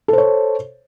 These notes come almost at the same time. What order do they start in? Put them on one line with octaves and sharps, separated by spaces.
A4 C5 C#5